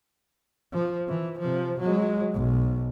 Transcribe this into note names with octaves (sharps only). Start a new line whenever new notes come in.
F3
E3
C3 F3
F#3 G#3
B1